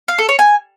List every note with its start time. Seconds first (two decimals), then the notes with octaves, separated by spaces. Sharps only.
0.08 F5
0.18 A4
0.29 C#5
0.39 G#5